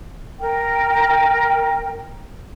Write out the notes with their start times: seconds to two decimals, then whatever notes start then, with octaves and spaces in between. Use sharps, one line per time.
0.40 A#4 G5